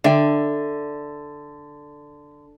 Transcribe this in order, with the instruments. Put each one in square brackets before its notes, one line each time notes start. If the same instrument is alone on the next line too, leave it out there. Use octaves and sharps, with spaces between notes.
[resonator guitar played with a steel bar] D3 [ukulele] D5 E5 G5